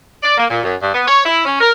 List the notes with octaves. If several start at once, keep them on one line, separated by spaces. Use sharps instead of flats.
D5
A#3
A#2
F#2
G2
B3
C#5
E4
C#4
A#4